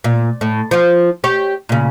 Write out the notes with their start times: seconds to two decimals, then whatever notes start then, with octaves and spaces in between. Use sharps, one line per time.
0.04 A#2
0.41 A2
0.71 F3 F4
1.24 G4 C#5
1.69 A#2 C#3